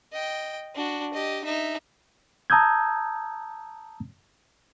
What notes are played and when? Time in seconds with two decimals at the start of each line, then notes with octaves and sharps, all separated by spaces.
0.12 D#5 G5
0.75 D4 F#4
1.13 G4 D#5
1.45 D#4 E5
2.50 A5 A#5 D#6 E6 G6 G#6